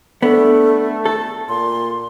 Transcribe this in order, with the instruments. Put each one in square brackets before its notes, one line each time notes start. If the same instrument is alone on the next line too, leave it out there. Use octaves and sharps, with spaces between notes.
[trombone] A3 [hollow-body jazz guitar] B3 D4 [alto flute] A4
[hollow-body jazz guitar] A4 [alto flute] A5
[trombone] A#2 [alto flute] C6